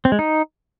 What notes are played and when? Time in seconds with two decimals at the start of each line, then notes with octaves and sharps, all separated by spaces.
0.05 C4
0.12 G#3
0.19 D#4